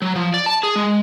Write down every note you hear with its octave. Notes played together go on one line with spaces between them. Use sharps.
F#3
F3
D5
A5
G#4
G#3